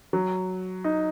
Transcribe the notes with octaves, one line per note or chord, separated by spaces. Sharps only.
F#3
D#4